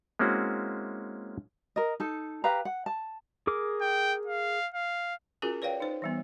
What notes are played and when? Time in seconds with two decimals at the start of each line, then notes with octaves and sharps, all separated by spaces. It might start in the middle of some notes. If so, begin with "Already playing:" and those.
0.19 G#3 A#3 C4 C#4 E4 F#4
1.76 A#4 D#5
2.00 D#4 A4
2.44 G4 B4 F5 A#5
2.65 F#5
2.86 A5
3.47 G#4 A#4 D6
3.81 G5
4.27 F5
4.74 F5
5.42 C#4 F4 F#4 G#4 A#4 G#5
5.62 B4 C#5 D5 F5 G5
5.80 D#4 C5
6.02 E3 G3 B3